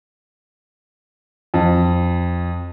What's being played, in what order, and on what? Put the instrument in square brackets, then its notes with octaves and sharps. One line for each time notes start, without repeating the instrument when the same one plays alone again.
[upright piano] F2